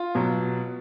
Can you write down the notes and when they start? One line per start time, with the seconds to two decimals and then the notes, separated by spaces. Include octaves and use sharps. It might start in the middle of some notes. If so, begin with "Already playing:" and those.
Already playing: F4
0.15 B2 F#3